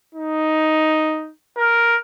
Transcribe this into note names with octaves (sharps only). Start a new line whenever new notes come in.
D#4
A#4